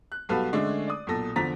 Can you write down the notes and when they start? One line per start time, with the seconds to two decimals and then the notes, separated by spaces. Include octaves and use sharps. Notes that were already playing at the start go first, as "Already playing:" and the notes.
0.12 F#6
0.29 B1 G3 F#4 A4 B4 F5
0.53 D3 G#3 A3 C#4 D4
0.87 D5 D#6
1.07 B1 A#2 A4 A#6
1.36 E2 D3 F3 A#5 A6 B6